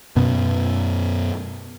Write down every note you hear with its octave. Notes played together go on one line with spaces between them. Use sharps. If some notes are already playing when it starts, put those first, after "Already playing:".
F#2 B2 B3